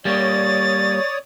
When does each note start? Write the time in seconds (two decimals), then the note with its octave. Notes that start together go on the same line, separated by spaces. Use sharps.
0.05 G3 A#3 C#5 D5 D#6 A6